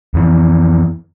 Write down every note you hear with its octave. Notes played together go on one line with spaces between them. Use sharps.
F2 E3